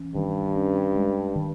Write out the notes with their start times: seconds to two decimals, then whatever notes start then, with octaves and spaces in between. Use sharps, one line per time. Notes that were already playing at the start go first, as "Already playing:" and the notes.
Already playing: E3 C#4
0.15 G2 D#3
0.55 C#4
0.95 G#3
1.36 D#3